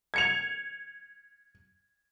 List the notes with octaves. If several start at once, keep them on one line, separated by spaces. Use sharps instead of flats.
G#6 C#7 F7